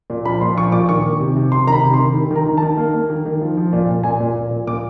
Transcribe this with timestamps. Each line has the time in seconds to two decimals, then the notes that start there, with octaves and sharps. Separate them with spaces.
0.10 A#2
0.25 F3 B5
0.41 A#2 C6
0.57 F3 C#6
0.72 A#2 D6
0.89 D#3 C#6
1.05 D#3
1.20 C3
1.36 C3
1.52 C3 C6
1.67 D#3 A#5
1.72 B5
1.83 C3
1.94 C6
2.00 D#3
2.14 D#3
2.31 D#3 A#5
2.46 D#3
2.57 D#3 A5
2.78 A#3
2.94 A#3
3.10 D#3
3.26 D#3
3.41 F3
3.57 F3
3.73 A#2
3.89 A#2
4.04 A#2 G#5
4.20 A#2
4.36 A#2
4.51 A#2
4.67 A#2 D6